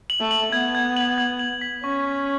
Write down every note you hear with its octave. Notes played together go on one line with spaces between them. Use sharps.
F#7
A3
F#7
B3 G#6
G#6
F#7
G#6
F#7
B6
C#4 C#6
C#6